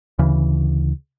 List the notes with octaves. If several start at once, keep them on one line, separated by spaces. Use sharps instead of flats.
D2 C#3 E3